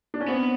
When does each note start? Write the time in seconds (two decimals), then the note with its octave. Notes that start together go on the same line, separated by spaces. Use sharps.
0.14 D4
0.21 C#4
0.28 B3 C4